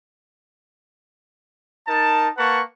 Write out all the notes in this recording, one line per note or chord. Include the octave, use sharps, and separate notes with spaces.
D#4 A#4 A5
A#3 B4 F#5 A5 C#6